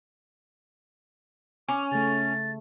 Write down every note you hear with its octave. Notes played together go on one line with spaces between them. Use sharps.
C#4 D6
C#3 A3 A6